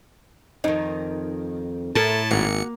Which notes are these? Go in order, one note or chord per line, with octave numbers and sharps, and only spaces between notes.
F2 D#3 D#4
A2 E4 A4 A#4 A5
G#1 A#3 F#4 C#7